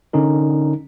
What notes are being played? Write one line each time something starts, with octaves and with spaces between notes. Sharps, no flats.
D3 C#4 D#4 A#4